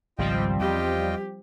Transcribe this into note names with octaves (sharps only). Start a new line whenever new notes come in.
G#1 C#2 F3 G3 C4 F4 D#5 G5
E2 F4 G4 D#5 G5